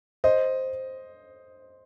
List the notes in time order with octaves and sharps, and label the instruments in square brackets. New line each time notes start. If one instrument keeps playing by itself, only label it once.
[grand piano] C5 D#5